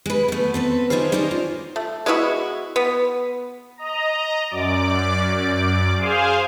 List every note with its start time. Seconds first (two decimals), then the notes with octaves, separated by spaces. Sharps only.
0.06 G#3 B4
0.28 A3 B3
0.54 C4 A4 B4
0.90 D4 D#4 F4 G#4 C5
1.12 C#4 D#4 A#4 C5 D5
1.31 F4
1.76 A3
2.06 G#3 B3 E4 F#4
2.76 B3
3.77 D#5 A#5
4.50 F#2 D5 D6
5.98 G#4 C5 F5 G#5